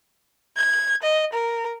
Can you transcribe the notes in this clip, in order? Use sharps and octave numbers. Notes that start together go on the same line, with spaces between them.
G#6
D#5
A#4